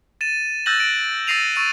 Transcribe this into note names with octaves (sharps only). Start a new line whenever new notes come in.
A6 D#7 E7
E6 F#6 G6 A6 A#6 F#7
D7
E6 A6 A#6 C7 D#7 F7
C#6 E6 A6 D#7